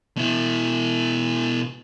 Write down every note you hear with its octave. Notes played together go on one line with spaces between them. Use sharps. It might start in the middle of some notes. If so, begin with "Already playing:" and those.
B2 E4